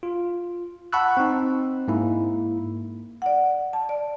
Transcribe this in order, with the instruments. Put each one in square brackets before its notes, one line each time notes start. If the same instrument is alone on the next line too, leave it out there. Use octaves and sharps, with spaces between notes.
[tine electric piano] F4
F#5 A5 B5 C#6 E6 F#6
C4 D#4
G#2 A#3 E4
[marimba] D5 F#5
A5
D5